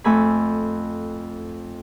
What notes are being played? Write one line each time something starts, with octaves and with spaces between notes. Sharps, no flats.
F2 A3 G#5 B5